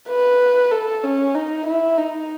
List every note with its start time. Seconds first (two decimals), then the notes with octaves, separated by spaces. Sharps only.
0.09 B4
0.71 A4
1.03 C#4
1.35 D#4
1.66 E4
1.97 D#4